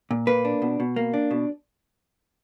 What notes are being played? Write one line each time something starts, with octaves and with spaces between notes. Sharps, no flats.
A#2
A#3 B4
D4
B2
B2
A#3
D4
B2